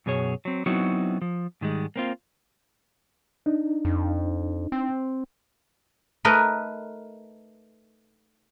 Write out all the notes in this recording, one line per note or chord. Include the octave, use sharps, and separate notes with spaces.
F#2 B2 G#4 C#5
F#3 C4
F#3 B3 C4 D#4 E4 F#4
F3
G#2 D#3 G3 G#3
A#3 C4 F4
D4 D#4
F2
C4
A3 D#4 A#4 B4 D#5